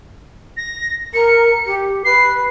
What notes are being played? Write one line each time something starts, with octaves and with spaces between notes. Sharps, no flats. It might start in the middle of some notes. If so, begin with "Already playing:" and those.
A#6
A#4 C#7
G4
B4 C7